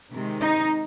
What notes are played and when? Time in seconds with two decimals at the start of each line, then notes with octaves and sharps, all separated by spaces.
0.12 C3 D#3 G#3
0.42 D#4